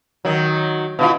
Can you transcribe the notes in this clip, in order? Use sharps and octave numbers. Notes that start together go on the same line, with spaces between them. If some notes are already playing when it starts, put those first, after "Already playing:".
D#3 F#3
B2 E4 F4